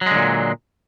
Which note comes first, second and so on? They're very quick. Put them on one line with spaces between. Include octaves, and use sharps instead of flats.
F#3 G#3 D3 A#2